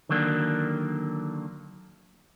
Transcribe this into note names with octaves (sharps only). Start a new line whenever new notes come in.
D3 D#3 F#3 A#3 D4